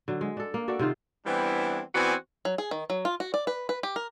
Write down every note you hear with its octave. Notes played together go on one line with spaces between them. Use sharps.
D3 F#3
G#3
D4 A4
A#3
F#4 A4 D5 E5
C3 D#3 F4 C5
E3 G3 B3 C4 D4 E4
E3 B3 C4 F#4 D5 G#5
F#3
G#4
D#3
F#3
F4
F#4
D5
B4
B4
G4
A#4